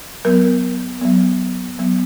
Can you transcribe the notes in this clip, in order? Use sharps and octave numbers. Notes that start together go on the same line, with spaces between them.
F#3 B3 A#4
F#3 B3
F#3 B3